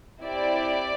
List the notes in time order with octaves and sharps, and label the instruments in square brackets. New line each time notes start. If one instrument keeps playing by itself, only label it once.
[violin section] C4 E4 G4 D5